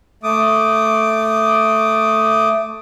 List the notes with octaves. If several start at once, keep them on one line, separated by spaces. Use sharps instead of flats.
A3 D6 D#6